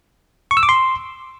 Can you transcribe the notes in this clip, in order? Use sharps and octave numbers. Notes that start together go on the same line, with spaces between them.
C#6
E6
D6
C6